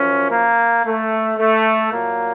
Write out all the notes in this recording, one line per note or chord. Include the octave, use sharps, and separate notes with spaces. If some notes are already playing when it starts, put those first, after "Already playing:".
Already playing: F#2 F3 C#4
A#3
A3
A3
A#2 F#3 A#3